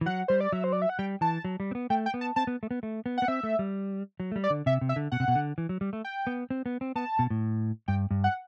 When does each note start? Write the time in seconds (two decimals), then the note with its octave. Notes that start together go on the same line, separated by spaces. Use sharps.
0.01 E3
0.06 F#3 F#5
0.28 G3 C5
0.41 D5
0.52 F#3 E5
0.64 C5
0.73 D5
0.82 E5
0.89 F#5
0.99 G3 G5
1.21 E3 A5
1.45 F#3
1.60 G3
1.71 C4
1.75 B3
1.90 A3 G5
2.06 G5
2.14 B3
2.21 A5
2.36 C4 A5
2.47 B3
2.63 A3
2.71 B3
2.83 A3
3.06 B3
3.18 B3 F#5
3.28 C4 E5
3.43 A3
3.59 G3
4.20 F#3
4.32 A3
4.36 G3
4.44 D5
4.50 D3
4.66 C3 E5
4.81 C3
4.89 E5
4.96 D3
5.12 B2 F#5
5.20 C3
5.28 B2
5.35 D3
5.58 E3
5.69 F#3
5.81 G3
5.93 A3
6.04 G5
6.27 B3
6.50 C4
6.66 B3
6.81 C4
6.96 B3 A5
7.19 B2
7.30 A2
7.88 G2 G5
8.11 G2
8.24 F#5